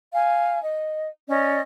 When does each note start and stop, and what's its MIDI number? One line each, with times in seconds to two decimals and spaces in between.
0.13 0.61 77
0.13 0.61 80
0.63 1.07 75
1.28 1.60 61
1.28 1.60 74
1.28 1.60 75